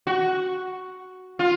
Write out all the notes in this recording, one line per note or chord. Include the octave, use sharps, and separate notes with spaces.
F#4
F4